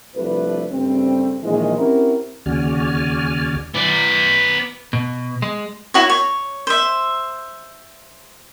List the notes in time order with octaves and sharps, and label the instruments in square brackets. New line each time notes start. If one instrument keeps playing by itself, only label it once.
[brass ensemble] C2 F3 A3 D4 B4
G2 C#3 G3 A3 C4
A#1 D#3 E3 G#3
C4 C#4 E4 F#4 G4 A#4
[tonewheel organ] D#2 C#3 F#4 D5 G#5 F6
[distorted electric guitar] B3 D5
[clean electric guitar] B2
G#3
[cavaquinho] E4 F#4 C#5
C#5
C5 E5